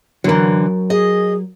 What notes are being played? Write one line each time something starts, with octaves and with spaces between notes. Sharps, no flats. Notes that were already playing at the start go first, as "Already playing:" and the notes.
D3 E3 F#3 A#4
G#4 D#5